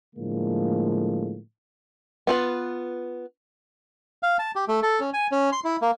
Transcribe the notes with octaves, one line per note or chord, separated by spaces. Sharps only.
A2 D3 F3 G#3 A#3
B3 F4 B4
F5
A5
G4
A3
A4
C#4
G#5
C#4
C6
E4
A#3